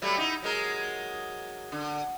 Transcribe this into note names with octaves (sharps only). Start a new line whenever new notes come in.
F#3 G3 A3
D#4 E4
F#3 G#3 A#4
D3